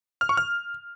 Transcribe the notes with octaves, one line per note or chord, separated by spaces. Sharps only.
F6
C#6
F6